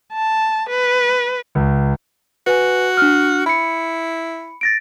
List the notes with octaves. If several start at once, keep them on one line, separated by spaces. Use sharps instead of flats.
A5
B4
C#2
F#4 B4 G#5
D4 F6
E4 B5 C#7
A6 A#6 D7